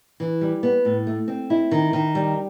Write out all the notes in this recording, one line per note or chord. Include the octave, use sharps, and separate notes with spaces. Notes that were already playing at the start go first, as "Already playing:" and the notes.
E3
G3
B3
A2
A3
C4
E4
D#3
D#3
G3